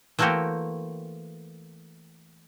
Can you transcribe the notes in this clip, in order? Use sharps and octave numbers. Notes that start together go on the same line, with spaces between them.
E3 A3 A#3 C4 F#4 G4